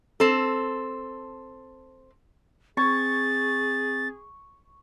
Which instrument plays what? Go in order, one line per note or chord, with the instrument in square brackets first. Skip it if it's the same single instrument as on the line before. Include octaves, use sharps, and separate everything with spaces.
[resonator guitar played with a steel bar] C4 A4
[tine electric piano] C4 G#6 [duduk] G#4 [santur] C#6 [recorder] A6